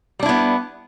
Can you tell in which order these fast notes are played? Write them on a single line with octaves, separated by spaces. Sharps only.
G3 D4 E4 B3